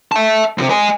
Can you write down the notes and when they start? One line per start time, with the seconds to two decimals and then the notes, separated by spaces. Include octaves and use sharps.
0.12 E5 A5
0.58 D#2 C3
0.70 D#5 G#5